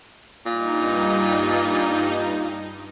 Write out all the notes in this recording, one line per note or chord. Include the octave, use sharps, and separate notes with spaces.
G2 A#2 D#4